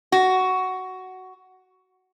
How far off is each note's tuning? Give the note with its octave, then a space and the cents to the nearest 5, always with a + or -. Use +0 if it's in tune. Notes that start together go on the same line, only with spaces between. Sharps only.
F#4 +10